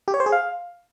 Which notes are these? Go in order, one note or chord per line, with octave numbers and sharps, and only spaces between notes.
G4
C#5
C5
G#4
F5